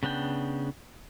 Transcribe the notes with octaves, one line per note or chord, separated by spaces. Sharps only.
C#3 B3 D4 G5